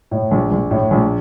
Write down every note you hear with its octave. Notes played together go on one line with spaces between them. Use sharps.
A2
A#1
A#1
A2
A#1